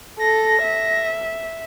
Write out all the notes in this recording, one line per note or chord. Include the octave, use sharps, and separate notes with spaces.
A4 A#6
E5